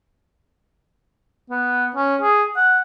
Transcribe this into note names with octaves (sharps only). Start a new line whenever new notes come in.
B3
C#4
G#4
F#5